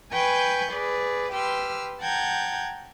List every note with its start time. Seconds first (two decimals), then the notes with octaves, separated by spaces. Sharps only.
0.13 B4 G5 G#5 B5 C#6 G6
0.73 G#4 B4 D5
1.33 G4 B4 G5 C6 E6 F6
2.02 F#5 G5 A5 A#5 G6 G#6